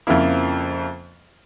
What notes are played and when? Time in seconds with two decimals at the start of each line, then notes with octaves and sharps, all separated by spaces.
0.07 F2 C#3 F3 A#3 E4